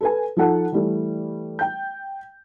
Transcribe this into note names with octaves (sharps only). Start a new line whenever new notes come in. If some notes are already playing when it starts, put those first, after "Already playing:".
A4 B4 G#5
F3 D#4 A4 F#5 A5
E3 G3 A3
G5 G6